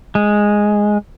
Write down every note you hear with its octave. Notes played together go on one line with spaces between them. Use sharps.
G#3